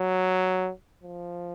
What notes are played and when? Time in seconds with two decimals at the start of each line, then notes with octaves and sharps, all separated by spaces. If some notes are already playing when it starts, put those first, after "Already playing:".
Already playing: F#3
1.03 F3